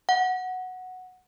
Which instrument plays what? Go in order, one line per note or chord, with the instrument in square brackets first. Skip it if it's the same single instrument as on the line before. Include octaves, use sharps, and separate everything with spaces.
[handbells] F#5